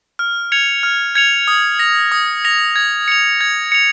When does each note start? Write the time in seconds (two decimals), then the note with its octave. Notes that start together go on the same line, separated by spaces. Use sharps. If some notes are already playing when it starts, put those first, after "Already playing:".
0.19 F6
0.52 G#6 C#7 F7
0.83 F6
1.15 G#6 C#7 F7
1.48 D#6
1.79 A#6 F7
2.12 D#6
2.45 A#6 F7
2.76 G#6
3.08 C#7 F7
3.41 G#6
3.72 C#7 F7